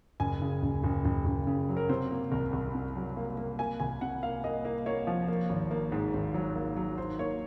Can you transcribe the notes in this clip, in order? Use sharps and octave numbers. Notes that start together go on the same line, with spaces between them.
F#1 G#5
C#3
F#1
F#1
F#1
F#1
C#3
F#3
A#4
C3 C5
A#3
C2 A#4
C2
C3
F#3
A#3
A#3
A#3 G#5
C2 G#5
C3 F#5
A#3 F5
A#3 D#5
A#3
A#3 C#5
F3
A#3
G#1
A#3
G#2
G#1
F#3
A#3
F#3
D#3 C5
A#3 C#5